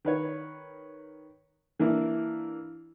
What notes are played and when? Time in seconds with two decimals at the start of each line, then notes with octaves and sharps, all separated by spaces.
0.05 D#3 B4 C#5
1.80 E3 A#3 D4 E4